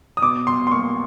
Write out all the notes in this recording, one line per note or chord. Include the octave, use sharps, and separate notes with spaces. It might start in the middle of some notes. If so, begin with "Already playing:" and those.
D#6
B2 D6
B2 C6
C6
A#3 C#6